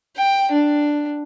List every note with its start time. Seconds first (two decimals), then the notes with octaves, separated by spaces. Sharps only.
0.16 G5
0.51 D4